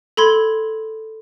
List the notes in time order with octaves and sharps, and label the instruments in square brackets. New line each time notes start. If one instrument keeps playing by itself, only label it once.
[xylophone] A4 B5 C6 G#6